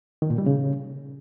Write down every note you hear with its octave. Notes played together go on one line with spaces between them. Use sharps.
D#3
A#2
G3
C#3